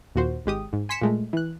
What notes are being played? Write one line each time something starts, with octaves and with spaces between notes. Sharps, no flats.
D#2 A#2 F#4 C5
G#1 G#3 G4 D#6
G#2
G#5 C6 B6 C#7 E7
A#2 G#3 A3
E3 F#6